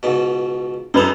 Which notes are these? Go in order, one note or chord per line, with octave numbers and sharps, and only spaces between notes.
C#2 G#2 B2
F#2 G#3 A4 B4 F7